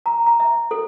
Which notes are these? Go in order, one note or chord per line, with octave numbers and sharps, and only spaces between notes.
A#5
A#5
E5
A4